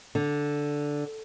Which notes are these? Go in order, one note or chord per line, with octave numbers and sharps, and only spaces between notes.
D3